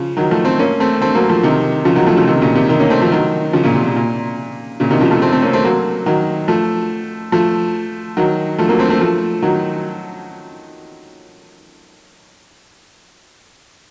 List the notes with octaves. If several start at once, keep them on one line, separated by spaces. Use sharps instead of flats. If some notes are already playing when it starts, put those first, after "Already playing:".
Already playing: C#3 F3
D#3 F#3
F3 A3
A3 C4
A#3 C#4
A3 C4
A3 C4
F#3 A#3
F3 A3
C3 D#3
C#3 F3
D#3 F#3
F3 A3
C#3 F3
C3 D#3
A#2 C#3
C3 D#3
C3 D#3
A#3 C#4
A3 C4
F3 A3
D#3 F#3
C#3 F3
A#2 C#3
C3
A#2
A#2
A#2 C#3
C3 D#3
C#3 F3
F3 A3
A3 C4
A3 C4
A#3 C#4
A3 C4
F#3 A#3
D#3 F#3
F3 A3
F3 A3
D#3 F#3
F3 A3
F#3 A#3
A3 C4
A3 C4
F3 A3
D#3 F#3